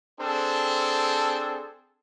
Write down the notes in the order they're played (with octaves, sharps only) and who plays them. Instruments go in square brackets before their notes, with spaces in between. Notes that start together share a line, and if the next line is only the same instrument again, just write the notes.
[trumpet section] C4 D4 G#4 A4 C5